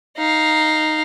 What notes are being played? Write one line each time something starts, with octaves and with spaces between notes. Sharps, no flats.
D#4 F5